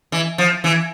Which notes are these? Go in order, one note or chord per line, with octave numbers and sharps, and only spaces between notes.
E3
F3
E3